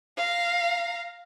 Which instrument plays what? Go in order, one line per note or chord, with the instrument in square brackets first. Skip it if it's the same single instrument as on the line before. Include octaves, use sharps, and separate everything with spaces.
[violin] F5 A#5